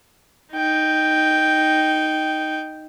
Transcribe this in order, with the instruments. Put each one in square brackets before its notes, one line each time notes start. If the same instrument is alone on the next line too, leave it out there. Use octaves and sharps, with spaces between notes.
[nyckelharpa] D#4 G5